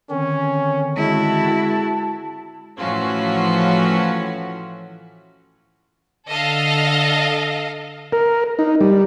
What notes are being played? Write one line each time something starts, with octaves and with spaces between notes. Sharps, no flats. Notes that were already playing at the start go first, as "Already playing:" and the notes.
D3 D#3 C4 C#4
G#3 E4 F#4 A5
A2 E3 F3 C#4 F4 F#4
D3 A4 D#5 F5
A#4
D#4
G3